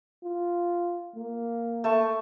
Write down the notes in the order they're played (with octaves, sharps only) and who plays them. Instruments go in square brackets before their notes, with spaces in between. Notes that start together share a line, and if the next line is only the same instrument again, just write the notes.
[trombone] F4
A#3
[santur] A3 A5 C#6